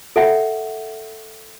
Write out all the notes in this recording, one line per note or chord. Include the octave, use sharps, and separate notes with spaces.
A4 E5 F#5 G5